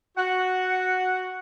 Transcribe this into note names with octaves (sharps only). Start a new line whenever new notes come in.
F#4 F#5